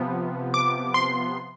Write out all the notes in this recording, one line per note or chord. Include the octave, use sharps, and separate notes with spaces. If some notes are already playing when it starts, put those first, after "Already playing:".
Already playing: C3 F3 B3
D6
C6